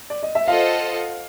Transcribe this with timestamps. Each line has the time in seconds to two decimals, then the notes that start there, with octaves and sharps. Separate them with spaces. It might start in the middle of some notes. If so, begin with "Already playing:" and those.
0.10 D5
0.23 D#5
0.35 E5
0.48 F4 A4 C5 D#5 F5 F#5